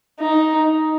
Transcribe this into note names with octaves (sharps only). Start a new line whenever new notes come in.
D#4